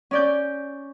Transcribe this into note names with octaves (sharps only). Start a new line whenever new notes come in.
C#4 D5 G6